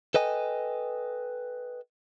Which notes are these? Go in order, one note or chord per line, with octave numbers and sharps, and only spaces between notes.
A4 B4 D#5 G5 G#5